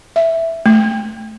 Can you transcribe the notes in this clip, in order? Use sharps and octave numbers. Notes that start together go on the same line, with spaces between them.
E5
A3